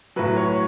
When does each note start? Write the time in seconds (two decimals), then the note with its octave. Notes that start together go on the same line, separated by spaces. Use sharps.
0.16 A2 F#3 B4
0.37 C#5